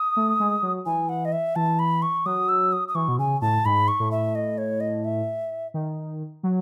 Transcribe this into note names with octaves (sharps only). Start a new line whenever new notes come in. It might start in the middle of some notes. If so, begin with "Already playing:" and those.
Already playing: D#6
A3
G#3
F#3
E3 G#5
F#5
D#5
E5
E3 A5
B5
C#6
F#3 D#6
E6
D#6
D#6
E3 C#6
B2
C#3 G#5
A2 A5
G#2 B5
C#6
A2
E5
D#5
C#5
D#5
E5
D#3
F#3